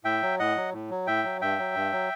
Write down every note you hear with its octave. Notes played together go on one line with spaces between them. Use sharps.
A2 E5 G5
F#3
A2 D#5 F#5
F#3
A2
F#3
A2 E5 G5
F#3
G2 E5 G5
F#3
G2
F#3